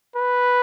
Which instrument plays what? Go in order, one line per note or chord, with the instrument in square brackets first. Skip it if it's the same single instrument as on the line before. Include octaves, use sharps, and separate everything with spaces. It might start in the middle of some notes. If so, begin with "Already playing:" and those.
[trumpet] B4